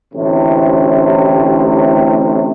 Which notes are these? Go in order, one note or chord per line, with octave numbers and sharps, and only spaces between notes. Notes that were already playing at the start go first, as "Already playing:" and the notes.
A1 D2 A2 C3